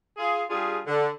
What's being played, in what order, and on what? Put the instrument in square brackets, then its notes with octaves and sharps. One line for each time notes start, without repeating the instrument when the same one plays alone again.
[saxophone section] F4 G#4
G3 D4 F4 G#4
D3